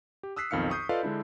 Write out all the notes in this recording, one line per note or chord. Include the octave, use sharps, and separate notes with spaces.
G4
D#6 E6 F#6 B6 C7
B1 F2 D#3 F5 F6 C#7
C#6 D#6 G6 C7
F4 A4 B4 D5 D#5 F5
D3 G#3 D4 E4